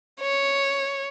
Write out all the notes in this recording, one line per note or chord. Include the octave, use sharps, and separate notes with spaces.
C#5